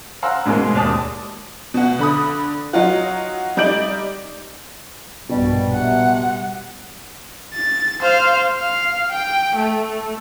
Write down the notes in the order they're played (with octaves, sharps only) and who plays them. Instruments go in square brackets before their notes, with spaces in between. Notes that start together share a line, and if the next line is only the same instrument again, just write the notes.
[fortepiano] F5 F#5 A#5 C6 E6
G#2 B2 G#3 A#3
D#2 D5 A5 D#6
[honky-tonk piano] B2 F#5
D3 B5 D#6
F#3 D#4 F4 F#4
G3 D#4 D5 G6 D7 F#7
[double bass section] A#1 G2 [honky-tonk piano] B2 [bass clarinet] G3
[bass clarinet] C3 [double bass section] G3 [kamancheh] F#5
[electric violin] A6
C5 F5
F5
G5
A3